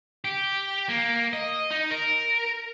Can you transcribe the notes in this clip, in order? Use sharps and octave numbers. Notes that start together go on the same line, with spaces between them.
G4
A#3
D#5
D#4
A#4